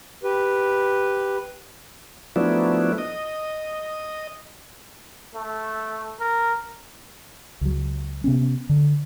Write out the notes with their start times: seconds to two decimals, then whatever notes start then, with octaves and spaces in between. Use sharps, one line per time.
0.23 G4 B4
2.36 F3 F#3 A3 B3 D4 E4
2.98 D#5
5.35 A3
6.20 A#4
7.61 C#2 F#3
8.24 C3 B3 C#4
8.69 D3